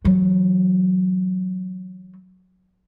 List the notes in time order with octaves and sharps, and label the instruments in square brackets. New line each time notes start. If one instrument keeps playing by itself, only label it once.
[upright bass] E3 F#3